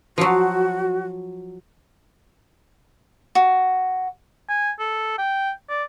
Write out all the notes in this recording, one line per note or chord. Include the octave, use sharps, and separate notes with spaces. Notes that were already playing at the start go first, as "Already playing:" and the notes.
F3 F#3 F#4
F#4
G#5
A4
G5
D5